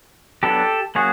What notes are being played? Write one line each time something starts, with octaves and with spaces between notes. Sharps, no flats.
F#3 B3 D4 G4 A4
F#3 A#3 C#4 F#4 G#4